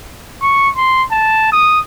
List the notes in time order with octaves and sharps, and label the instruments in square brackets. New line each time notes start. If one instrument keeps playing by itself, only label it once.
[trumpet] C#6
C6
A5
D#6